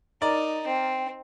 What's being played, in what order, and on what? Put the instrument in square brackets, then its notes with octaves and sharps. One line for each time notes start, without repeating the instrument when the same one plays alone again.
[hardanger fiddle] D#4 [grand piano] A#4 D5
[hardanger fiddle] C4